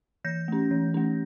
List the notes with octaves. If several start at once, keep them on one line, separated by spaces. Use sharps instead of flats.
E3 G6 A#6
A3 C#4
E3
A3 C#4